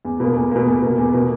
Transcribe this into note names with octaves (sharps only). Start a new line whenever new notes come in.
E2
B2 A#3
E2
B2 A#3
E2
B2 A#3
E2
B2 A#3